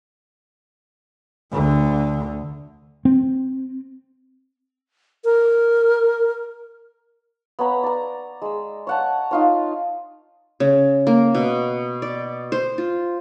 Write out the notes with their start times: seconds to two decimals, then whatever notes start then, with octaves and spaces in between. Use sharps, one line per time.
1.52 D2 D3
3.05 C4
5.25 A#4
7.59 B3 C#5 A#5 B5
7.83 D5 A#5
8.42 G#3 E6
8.87 C#5 F#5 A5
9.31 D#4 F4 C#5
10.60 C#3
11.07 A#3
11.35 B2
12.02 D5
12.52 C5
12.78 F4